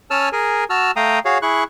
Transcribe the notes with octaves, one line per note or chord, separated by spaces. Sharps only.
C#4 C#5 G#5 A5 E6 F6
G#4 A#4 G#5
F#4 A5 E6 F6
A3 F5 G5 A#5 D#6
F#4 G#4 C#5 F5
E4 G#4 C#6 F#6